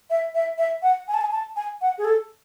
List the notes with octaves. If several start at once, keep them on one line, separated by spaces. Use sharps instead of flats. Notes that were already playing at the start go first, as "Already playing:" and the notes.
E5
E5
E5
F#5
G#5
A5
G#5
A5
G#5
F#5
G#4
A4